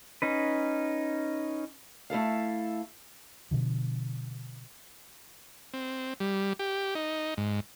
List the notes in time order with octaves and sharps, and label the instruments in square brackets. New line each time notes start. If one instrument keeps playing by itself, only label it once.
[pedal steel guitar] C#4 D#4 B4
[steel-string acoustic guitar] A3 E4 A4 F5
[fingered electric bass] B2 D3 F3
[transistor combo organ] C4
G3
G4
D#4
G#2